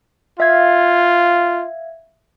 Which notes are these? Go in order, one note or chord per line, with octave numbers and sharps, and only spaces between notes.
F4 E5 F5 G#6